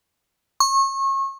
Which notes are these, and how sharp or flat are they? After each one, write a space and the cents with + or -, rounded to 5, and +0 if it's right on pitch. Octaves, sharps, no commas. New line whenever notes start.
C#6 -30